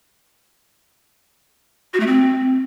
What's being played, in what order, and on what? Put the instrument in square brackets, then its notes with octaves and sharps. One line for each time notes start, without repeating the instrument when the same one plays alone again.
[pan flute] F#4
A3
C4